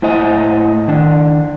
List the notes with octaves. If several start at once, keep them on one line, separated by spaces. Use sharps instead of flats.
A2 E4 C5 D#5
D#3 D4